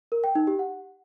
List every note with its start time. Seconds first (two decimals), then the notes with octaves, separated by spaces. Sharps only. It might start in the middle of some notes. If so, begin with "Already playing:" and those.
0.12 A#4
0.24 G5
0.35 D#4
0.47 G4
0.59 F#5